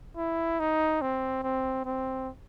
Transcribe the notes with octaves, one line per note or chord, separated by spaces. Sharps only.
E4
D#4
C4
C4
C4